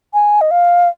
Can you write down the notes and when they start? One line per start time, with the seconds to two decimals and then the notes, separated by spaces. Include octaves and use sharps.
0.14 G#5
0.41 D#5
0.51 F5